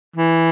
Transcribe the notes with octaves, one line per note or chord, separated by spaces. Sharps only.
E3